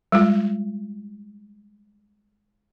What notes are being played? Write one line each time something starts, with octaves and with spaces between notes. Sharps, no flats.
G3 G#3 F4